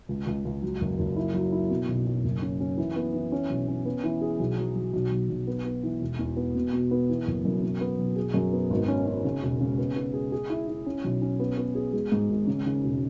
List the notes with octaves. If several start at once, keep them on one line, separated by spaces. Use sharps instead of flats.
C#2
C#2
C#2
F#3
F#1
F#1
E4
F#3
E4
B2
B1
B1
F#1
C#4
C#4
E3
B3
E3
C#4
B1
C#4
B3
E3
G#4
B1
F#3
F#3
B1
B1
B1
B3
B3
E3
E1
E2
B3
B2
B2
B3
E3
F#1
F#2
B2
B3
B1
G#4
F#2
B3
G#1
C#4
C#4
C#3
E1
C#3
B3
B3
G#4
G#4
E4
E4
C#4
B1
C#4
B3
B3
G#4
G#3
G#2
G#1
C#3
C#3
E1